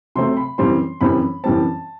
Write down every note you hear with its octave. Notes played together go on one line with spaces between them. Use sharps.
C3 F#3 A3 C4 C6
B5
F#2 E3 G3 C4 C6
F#2 E3 G3 C4 B5
F#2 E3 G3 C4 A5